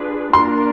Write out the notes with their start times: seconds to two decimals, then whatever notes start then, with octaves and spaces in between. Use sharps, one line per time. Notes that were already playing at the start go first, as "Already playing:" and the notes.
Already playing: D4 F4 G#4 B4
0.33 A#3 D4 F4 A#4 C6